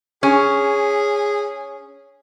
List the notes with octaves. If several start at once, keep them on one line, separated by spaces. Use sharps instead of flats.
C#4 G#4